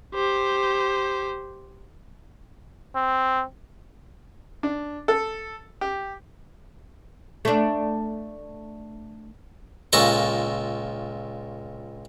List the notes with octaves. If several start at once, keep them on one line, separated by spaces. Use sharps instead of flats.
G4 C5
C4
D4
A4
G4
A3 D4
C#2 A#2 A4 A#5 C#6